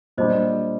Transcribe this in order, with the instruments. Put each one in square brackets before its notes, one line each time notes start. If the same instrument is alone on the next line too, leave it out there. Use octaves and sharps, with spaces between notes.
[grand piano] A#2 G3 D4 G4 [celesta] C5 D#5